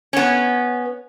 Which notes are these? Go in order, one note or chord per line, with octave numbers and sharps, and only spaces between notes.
B3 C#4